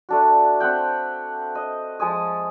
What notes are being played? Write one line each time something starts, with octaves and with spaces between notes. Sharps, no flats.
A3 D4 F#4
C4 E5 F#5 G5
D#5
F3 G#3 G#5 D#6